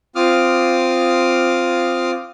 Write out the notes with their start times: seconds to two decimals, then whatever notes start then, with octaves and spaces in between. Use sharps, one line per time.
0.15 C4 F4 D6 D#6 F6